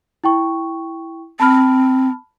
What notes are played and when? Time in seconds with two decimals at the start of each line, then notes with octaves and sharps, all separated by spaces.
0.24 E4 G5 C#6
1.40 C4 A5 B5 F6